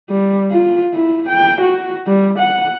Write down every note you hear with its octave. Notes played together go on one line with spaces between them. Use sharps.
G3
F4
E4
G5
F#4
G3
F#5